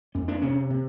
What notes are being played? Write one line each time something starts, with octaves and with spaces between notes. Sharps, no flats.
F2 C#4
D4
C3 C#4
C3